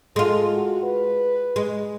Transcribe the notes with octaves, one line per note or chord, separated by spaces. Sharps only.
G#3 F4 A4
F#4
B4
G#3